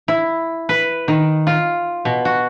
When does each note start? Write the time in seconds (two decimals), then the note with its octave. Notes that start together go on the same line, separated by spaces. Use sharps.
0.08 E4
0.69 B4
1.08 D#3
1.47 F4
2.05 B2
2.25 F#4